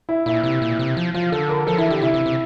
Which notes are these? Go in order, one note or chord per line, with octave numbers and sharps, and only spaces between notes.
E4
A#2 E4
C3
A#2
C3
F3
F3 F4
D3 A4
A#4
F3 A4
E3 E4
D3 G4
C3 E4
C3
C3